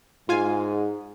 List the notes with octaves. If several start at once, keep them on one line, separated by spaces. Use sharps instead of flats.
G#2 F4 F5 G#5